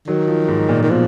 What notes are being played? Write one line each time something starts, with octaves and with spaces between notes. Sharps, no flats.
D#3 F#3
F3
G#2
A#2
D#3
B2 F3